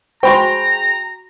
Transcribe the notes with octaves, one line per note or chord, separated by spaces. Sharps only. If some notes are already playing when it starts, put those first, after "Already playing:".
G#3 F#4 C5 G5 A#5 B5 C#6